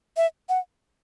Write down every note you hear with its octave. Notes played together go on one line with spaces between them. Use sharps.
E5
F#5